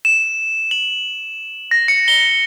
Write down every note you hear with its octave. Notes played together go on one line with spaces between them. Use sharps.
E7
F#7
A#6
C#7
G7